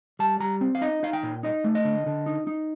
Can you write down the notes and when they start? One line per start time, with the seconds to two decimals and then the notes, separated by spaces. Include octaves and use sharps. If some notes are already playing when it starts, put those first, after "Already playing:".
0.19 G3 A5
0.40 G3 A#5
0.61 C4
0.75 F5
0.81 D#4 D#5
1.03 D#4 F5
1.13 G5
1.23 A#2
1.43 D#4 D#5
1.64 A3
1.75 D#5
1.85 D3
2.06 D3
2.26 D#4
2.47 D#4